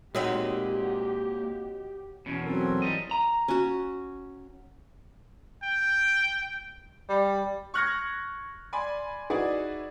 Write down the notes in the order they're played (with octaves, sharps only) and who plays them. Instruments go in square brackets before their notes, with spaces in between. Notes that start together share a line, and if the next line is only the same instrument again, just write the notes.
[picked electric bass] A#2 [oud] G#3 C4 D#4 [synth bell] F#4 C#5 F#5 [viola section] G4
[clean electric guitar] E2 B2 [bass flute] C#4 [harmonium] C#5
[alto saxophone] F#3 [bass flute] C4 [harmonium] C#4 A4 A#4
[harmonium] G#2 E3 A#5 [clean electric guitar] G3 D#5
[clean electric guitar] A#5
[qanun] C#4 F#4
[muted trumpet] G5
[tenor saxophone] G3
[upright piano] C#6 F6 F#6 G#6 A#6 C#7
D5 G#5 B5 C6
D#4 E4 F#4 G#4 B4 D5